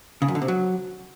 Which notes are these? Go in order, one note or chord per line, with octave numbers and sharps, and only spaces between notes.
C#3
F#2
D3
C3
F#3